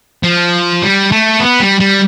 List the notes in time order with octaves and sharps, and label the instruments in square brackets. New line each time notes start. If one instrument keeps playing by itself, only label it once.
[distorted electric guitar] F3
G3
A3
B3
G3
G3